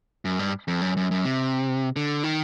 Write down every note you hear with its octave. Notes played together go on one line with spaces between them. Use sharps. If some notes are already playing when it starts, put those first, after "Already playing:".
F#2
G2
F2
F#2
F#2
F#2
C3
D3
D#3